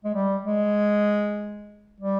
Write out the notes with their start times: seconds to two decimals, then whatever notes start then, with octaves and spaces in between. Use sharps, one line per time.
0.05 G#3
0.15 G3
0.45 G#3
2.01 G3